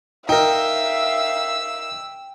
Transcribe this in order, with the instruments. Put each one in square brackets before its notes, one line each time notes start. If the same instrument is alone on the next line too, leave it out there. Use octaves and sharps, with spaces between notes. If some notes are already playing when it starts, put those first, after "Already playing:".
[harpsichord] D#4 A#4 [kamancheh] E5 F5 [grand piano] G5 [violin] E6